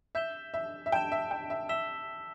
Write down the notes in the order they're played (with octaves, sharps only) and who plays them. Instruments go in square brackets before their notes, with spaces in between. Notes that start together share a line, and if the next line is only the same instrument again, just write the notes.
[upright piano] E5 [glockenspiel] G6 E7 G7
[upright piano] E5
E5
[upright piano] G5 [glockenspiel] A5 G6 E7
[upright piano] E5
G5
E5
[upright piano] E5 [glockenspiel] E6 B6 E7 G7